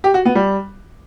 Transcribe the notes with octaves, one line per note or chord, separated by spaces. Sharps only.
G4
F#4
B3
G3